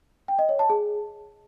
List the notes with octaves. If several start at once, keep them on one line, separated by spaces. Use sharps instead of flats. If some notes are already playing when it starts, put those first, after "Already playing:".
G5
D#5
C#5
A5
G#4